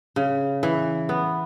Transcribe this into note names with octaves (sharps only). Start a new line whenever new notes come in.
C#3
E3
B3